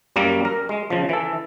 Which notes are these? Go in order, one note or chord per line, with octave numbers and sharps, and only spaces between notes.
F#2 G3 A#3
A#4
G#3
C#3 F3
E3 A4